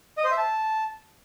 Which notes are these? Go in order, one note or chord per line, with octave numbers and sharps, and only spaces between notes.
D#5
C5
E5
A5